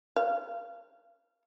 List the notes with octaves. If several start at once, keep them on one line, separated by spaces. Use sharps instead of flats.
F5